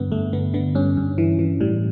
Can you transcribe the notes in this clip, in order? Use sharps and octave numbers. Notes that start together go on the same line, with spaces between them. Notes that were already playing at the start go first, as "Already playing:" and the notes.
Already playing: G2 D3 B3
G2 A3
D3 B3
D3 B3
G2 C#4
G2
E3
E3
A2 G3